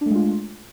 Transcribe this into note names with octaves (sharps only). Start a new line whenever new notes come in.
G#3 A3 D4 F4